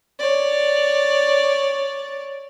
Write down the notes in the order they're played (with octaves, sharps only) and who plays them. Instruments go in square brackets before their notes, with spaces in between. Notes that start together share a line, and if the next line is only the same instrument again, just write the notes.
[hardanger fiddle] C#5 D5